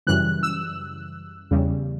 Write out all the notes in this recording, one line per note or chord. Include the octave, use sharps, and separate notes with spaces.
F#2 C#3 E3 G3 F#6
E6
E2 C#3 G3